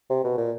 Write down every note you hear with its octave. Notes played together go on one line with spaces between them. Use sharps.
C3
B2
A#2